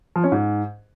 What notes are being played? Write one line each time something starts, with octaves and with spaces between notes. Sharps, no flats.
F3
C#4
G#2